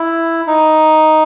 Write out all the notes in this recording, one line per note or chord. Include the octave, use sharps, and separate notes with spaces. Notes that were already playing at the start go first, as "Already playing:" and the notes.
Already playing: E4
D#4